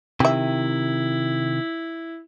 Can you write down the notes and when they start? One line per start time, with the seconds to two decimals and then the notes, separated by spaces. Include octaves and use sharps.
0.20 C3 D#3 E4 G4 E5